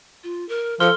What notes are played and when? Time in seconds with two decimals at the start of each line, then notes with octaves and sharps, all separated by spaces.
0.24 F4
0.49 A#4
0.80 F3 A4 C6 F6 G7